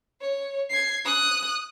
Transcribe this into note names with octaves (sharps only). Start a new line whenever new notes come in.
C#5
G#6 C7
D#6 F#6